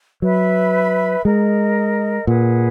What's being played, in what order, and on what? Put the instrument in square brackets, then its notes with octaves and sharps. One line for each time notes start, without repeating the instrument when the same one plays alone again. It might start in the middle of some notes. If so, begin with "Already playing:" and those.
[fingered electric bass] F#3 [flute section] B4 E5 B5
[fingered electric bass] G#3 [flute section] A#4 D#5 A#5
[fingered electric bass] A#2 [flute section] G#4 B4 F#5